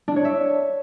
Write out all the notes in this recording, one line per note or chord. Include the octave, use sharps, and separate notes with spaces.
D4
C#5
E5